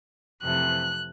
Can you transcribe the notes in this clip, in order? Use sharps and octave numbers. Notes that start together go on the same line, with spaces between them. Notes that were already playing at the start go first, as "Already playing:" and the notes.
F2 C3 E3 A3 F#6